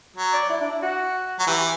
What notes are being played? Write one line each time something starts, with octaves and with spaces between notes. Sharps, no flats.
F#3
D5
E4
D4
E4
F#4
F#3
E3 G4
G4